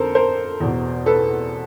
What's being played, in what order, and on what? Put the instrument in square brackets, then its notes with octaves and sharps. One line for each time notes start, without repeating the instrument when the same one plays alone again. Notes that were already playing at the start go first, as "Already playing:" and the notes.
Already playing: [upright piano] F2 D3 A4 A#4 C5
A#4 C5
E2 B2
A4 B4